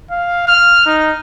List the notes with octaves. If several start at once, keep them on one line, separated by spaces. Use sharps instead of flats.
F5
F6
D#4